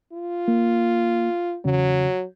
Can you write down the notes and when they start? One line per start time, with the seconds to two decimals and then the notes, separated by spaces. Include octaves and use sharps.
0.12 F4
0.48 A#3
1.65 E2 C#3 F#3